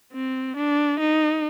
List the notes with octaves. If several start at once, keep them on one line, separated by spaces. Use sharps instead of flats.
C4
D4
D#4